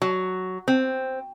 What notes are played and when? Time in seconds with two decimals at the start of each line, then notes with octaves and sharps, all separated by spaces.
0.02 F#3
0.68 C4